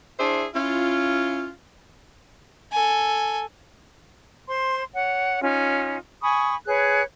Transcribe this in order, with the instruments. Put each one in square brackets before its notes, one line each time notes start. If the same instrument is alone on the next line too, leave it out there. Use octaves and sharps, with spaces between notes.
[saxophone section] D4 E4 G#4 C5 E5
C#4 E4 F4
[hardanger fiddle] A4 G#5
[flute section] C5 C6
C#5 F#5
C#4 D#4 F4
G#5 B5 C#6 D#6
G#4 B4 C#5 F#6